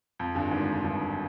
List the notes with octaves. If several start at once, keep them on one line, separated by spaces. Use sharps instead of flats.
F2
G1 G2
G#1 G#2
G1 G2